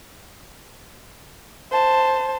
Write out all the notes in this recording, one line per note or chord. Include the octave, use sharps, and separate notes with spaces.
C5 A5